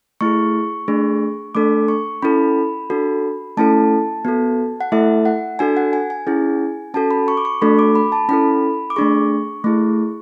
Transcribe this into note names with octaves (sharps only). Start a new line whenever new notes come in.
A3 E4 G#4 C#6
A3 D4 G#4
A3 D4 A4 D6
C#6
C#4 E4 A4 B5
D4 F#4 A4
A3 C#4 E4 A4 A5
B3 F#4 A4
F#5
A3 E4 A4 E5
F#5
D4 F#4 A4 G#5
F#5
G#5
G#5
C#4 E4 G#4
C#4 F#4 A4 A5
B5
C#6
D6
C#6
A3 D4 F#4 A4 B5
D6
B5
A5
C#4 E4 A4 B5
D6
A3 D4 G#4 C#6
A3 E4 G#4